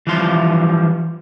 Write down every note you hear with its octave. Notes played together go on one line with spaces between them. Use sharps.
E3 F3 G3 F5 C6